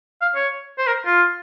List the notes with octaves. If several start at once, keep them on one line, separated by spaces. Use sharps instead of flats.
F5
C#5
C5
A#4
F4